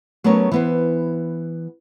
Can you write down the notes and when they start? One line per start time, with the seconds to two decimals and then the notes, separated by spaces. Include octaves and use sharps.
0.24 F#3 A3 B3 C#4 A#4 C#5
0.51 E3 B3 C5